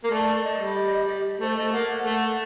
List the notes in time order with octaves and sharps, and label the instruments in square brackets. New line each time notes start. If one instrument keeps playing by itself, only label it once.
[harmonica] A#3
[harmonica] A3 [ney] D5
[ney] D#5
[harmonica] G3
[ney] G4
[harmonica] A3 [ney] C5
[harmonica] A3 [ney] D#5
[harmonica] A#3 [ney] F#5
[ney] F#5
[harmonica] A3